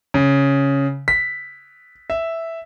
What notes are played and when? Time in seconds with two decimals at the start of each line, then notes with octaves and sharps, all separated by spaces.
0.14 C#3
1.08 B6
2.10 E5